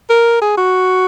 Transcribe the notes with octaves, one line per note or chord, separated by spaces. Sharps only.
A#4
G#4
F#4